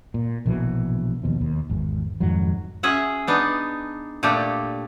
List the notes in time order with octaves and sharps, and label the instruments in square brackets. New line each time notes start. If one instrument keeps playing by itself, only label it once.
[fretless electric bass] A#2
A#1 B2 E3 F#3
D#2 B2 F3
D#2
G#1 E2
F2 G#2 D#3 F#3
[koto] C#4 G#4 E5 F#5
B3 D4 D#4
A#2 A3 D4 G4